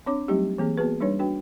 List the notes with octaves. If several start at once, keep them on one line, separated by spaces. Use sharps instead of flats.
C4 D4 C#5 D6
F#3 G3 A3 C4 D#4 G4
E3 A#3 C4 G#4
A#3 B3 F#4 G#4 B4
G3 D4 D#4 B4 C#5
D4 F#4 B4 G5